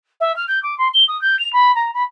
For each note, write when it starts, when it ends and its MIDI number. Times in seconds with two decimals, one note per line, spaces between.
0.20 0.35 76
0.36 0.44 89
0.48 0.62 91
0.63 0.77 86
0.78 0.88 84
0.94 1.04 103
1.08 1.20 87
1.21 1.38 91
1.39 1.51 101
1.53 1.75 83
1.75 1.91 82
1.94 2.03 83